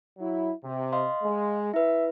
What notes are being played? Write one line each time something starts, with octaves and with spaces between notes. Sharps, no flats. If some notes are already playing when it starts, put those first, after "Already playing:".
F#3 E4
C3
D#5 F5 C6
G#3
E4 B4 E5